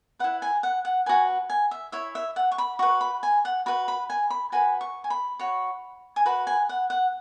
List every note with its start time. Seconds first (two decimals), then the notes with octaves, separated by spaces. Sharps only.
0.19 E4 B4 F#5
0.42 G#5
0.63 F#5
0.85 F#5
1.06 F#4 B4 G#5
1.50 G#5
1.71 E5
1.92 E4 C#5 E5
2.15 E5
2.36 F#5
2.52 C#6
2.58 B5
2.79 F#4 B4 C#6
3.01 B5
3.23 G#5
3.45 F#5
3.66 F#4 B4 B5
3.88 B5
4.10 G#5
4.30 B5
4.52 F#4 B4 G#5
4.81 C#6
5.04 G#5
5.10 B5
5.40 F#4 C#5
6.16 G#5
6.26 F#4 B4 B5
6.47 G#5
6.69 F#5
6.90 F#5